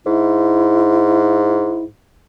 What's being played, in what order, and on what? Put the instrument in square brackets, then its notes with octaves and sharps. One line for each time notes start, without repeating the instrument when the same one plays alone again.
[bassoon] G#2 [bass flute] E4